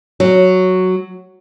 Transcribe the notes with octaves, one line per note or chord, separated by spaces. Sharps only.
F#3